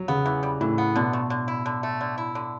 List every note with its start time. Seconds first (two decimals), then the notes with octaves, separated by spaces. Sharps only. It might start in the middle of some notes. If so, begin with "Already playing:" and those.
Already playing: F#3
0.08 C#3 B3
0.26 E3
0.43 G3
0.61 A2 E3
0.78 B3
0.96 B2 D3
1.13 A3
1.30 D3
1.48 E4
1.66 D3
1.83 A3
2.01 D3
2.18 E4
2.35 D3